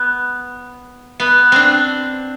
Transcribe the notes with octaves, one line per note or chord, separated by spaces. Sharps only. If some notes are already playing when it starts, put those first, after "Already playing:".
Already playing: B3
B3
C4 D4